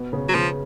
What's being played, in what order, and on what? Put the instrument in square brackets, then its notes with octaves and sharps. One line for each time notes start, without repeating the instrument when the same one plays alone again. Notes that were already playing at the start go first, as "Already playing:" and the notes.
Already playing: [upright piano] B2 B3
C#3
[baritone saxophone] F#3
[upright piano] C#3 [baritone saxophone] F3